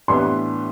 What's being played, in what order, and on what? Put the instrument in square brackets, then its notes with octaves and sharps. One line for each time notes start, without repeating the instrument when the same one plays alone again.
[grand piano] A2 E3 G3 B3 D4 [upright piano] C6